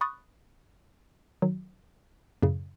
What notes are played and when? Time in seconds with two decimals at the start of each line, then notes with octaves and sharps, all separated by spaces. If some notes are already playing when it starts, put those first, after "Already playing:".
0.01 B5 C#6 D#6 F#6 A6
1.42 D#3 F#3
2.43 F#2 A2 C#3